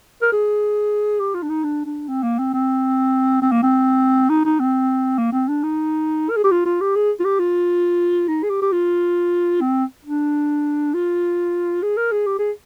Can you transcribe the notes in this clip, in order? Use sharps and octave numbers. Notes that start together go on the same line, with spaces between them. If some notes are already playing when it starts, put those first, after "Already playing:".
A#4
G#4
G4
F4
D4
D#4
D4
D4
C4
A#3
C4
C4
C4
A#3
C4
D#4
D#4
C4
A#3
C4
D4
D#4
A#4
G#4
G4
F4
F4
G4
G#4
F4
G4
F4
D#4
G#4
G4
G4
F4
C4
D4
F4
G#4
A#4
G#4
G4
G#4